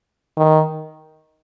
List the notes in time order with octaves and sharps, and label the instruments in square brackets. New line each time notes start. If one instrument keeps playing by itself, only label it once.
[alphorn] D#3